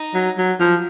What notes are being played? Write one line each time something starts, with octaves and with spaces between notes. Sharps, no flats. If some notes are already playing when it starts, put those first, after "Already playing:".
Already playing: D#4
F#3
F#3
F3